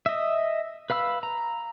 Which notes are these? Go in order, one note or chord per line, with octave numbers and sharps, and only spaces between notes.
D#5 E5
B4 F5 B5 E6
A#5